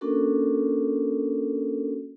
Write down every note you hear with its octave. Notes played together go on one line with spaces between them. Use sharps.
A#3 C#4 D4 F#4 A4 A#4